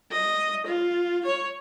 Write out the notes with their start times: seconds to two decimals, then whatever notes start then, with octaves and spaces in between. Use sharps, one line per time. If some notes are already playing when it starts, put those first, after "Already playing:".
0.12 D#5
0.66 F4
1.25 C#5